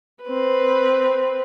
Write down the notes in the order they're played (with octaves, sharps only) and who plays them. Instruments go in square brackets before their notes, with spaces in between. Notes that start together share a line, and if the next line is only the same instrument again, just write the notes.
[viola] C4 B4